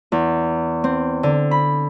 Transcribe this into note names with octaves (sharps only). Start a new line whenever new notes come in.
E2
C4
D3
B5